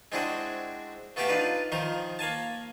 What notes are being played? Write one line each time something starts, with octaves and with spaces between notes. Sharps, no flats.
G#3 C4 D4 E4 F#4 G#4
A3 B3 F#4 G4 F5 G5
D4 D#4 F4 B4
D#3 F3 D#4 A#5 C6
A#3 F5 G#5 A5